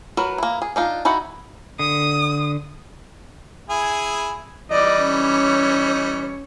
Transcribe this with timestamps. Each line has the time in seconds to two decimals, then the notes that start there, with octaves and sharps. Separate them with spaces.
0.17 F#3 A#4 B4
0.38 A#3 E4
0.62 G#4
0.76 D4 D#4 F4
1.05 D#4 E4 F#4 F#5
1.79 D3 D#6
3.70 E4 G#4 G#5
4.71 E3 G3 D#4 D5 D#5
5.04 C#4 C#5